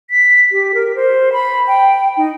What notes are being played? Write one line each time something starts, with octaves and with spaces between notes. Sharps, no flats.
B6
G4
A#4
C5
B5
G5
D#4